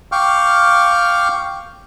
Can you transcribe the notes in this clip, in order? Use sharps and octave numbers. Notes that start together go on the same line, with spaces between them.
F5 G5 C#6 D6 F6